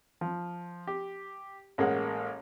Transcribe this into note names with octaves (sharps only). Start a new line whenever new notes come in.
F3
G4
A1 G#3 A#3 F#5